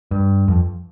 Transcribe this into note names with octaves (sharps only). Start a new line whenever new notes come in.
G2
F2